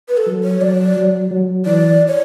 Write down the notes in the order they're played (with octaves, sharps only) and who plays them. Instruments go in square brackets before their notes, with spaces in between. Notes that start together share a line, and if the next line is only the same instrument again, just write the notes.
[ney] B4
A4
[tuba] F#3
[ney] C#5
[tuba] F#3 [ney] D5
[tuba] F#3
F#3
[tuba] E3 [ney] D5
[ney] C#5